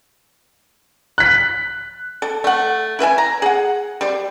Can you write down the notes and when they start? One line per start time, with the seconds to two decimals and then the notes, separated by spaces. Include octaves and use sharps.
1.18 F#6 B6
2.22 A4
2.44 A3 F#5
2.99 E4 B4 E5 G#5
3.18 A#5
3.42 G#4 F#5
4.01 G3 C5